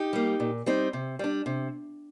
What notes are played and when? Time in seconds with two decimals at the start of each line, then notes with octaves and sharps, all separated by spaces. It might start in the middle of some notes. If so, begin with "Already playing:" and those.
Already playing: D#4 G4
0.13 G3 A#3
0.40 A#2
0.66 G3 C4 D#4
0.93 C3
1.19 G3 D4
1.46 C3